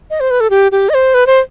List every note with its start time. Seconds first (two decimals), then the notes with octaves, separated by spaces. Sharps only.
0.10 D#5
0.20 C5
0.31 B4
0.40 A4
0.50 G4
0.72 G4
0.89 D#5
0.94 C5
1.14 B4
1.27 C5